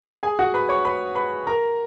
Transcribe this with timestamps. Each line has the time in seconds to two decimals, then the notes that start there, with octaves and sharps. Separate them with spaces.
0.23 G#4 G#5
0.39 F#4 F#5
0.54 B4 B5
0.69 C#5 C#6
0.85 B4 B5
1.15 B4 B5
1.47 A#4 A#5